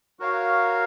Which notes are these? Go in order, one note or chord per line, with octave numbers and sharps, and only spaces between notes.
F#4 A#4 C#5 F5